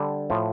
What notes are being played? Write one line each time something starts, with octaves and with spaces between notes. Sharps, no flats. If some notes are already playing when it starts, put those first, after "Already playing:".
Already playing: D3 G3 D4 A4 C5
A2 F3